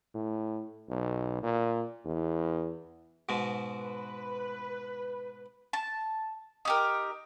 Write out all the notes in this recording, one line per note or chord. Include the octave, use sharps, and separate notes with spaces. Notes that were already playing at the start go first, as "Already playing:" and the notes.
A2
B1
A#2
E2
G#2 B2 G#3
B4
A5
D#4 G4 A#4